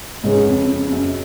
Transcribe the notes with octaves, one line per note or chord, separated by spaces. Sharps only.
G#2 C#3 G#3 C#4 G#4 B4
F2
F2
F#2